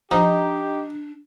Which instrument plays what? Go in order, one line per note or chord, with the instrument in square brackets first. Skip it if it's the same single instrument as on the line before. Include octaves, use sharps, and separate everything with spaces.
[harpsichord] F3 [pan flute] D4 [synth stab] D#4 [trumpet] G4